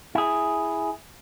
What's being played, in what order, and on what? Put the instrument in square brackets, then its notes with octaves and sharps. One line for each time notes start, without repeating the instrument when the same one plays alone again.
[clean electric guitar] E4 G#4